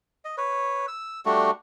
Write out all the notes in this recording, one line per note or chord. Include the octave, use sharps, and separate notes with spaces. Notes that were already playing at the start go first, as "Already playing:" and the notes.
D#5
B4 C#5
E6
G3 A3 D4 F#4